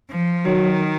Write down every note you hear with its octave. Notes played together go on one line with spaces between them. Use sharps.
F3
D#3 F#3